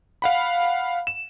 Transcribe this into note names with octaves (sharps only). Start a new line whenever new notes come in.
F5 F#5 B5
E7